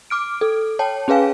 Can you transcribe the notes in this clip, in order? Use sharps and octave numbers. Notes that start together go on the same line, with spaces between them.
D6 F6 D7
A4
C#5 G5 A5
C#4 G#4 B4 F5 G#5